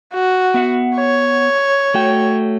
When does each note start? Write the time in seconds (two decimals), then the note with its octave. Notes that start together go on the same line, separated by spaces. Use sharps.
0.14 F#4
0.54 B3 E5 F#5
0.96 C#5
1.94 A3 F#4 G5